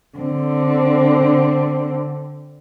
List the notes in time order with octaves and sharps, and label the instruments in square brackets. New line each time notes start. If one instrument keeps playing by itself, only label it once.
[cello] D3 C4